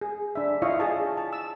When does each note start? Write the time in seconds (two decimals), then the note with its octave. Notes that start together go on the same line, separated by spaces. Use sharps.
0.01 G#4
0.35 D4 E5
0.62 E4 F4 C#5 D#5 F5 C#6
0.80 G#4 D#5 A5
1.17 A5
1.33 E6